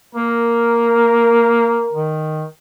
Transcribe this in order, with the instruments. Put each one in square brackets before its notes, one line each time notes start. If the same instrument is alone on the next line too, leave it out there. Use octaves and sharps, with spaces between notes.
[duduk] A#3 [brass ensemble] A#4
[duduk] D#3